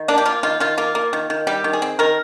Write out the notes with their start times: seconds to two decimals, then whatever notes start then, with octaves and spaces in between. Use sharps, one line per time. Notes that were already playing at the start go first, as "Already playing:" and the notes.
Already playing: D#3
0.08 A#3 D4
0.18 G4
0.25 A#3 F4
0.43 D#3 F4
0.60 D#3 F4
0.78 A#3 F4
0.95 A#3
1.13 D#3
1.30 D#3
1.47 G3 G4
1.64 D#3
1.73 G#4
1.82 C4
1.99 D#3 A#4